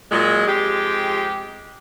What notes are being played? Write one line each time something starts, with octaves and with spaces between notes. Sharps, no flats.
A#2 F#3 G#3
F2 G#3 G4